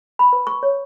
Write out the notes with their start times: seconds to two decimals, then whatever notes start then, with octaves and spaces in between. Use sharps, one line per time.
0.19 B5
0.33 B4
0.47 C#6
0.63 C#5